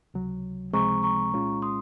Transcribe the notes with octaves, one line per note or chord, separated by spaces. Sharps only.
C#2 C3 F#3
C#2 C3 F3 G#3 C4 A#5 C#6
A#5 C#6
C2 A#2 G#3 C#4 F4
C6 D#6